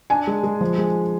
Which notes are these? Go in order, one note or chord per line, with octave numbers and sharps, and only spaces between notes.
D4 G#5
G#3
G#3
F3
G#3